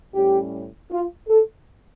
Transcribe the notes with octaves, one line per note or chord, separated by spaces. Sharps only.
A2 G3 C#4 G4
F4
A4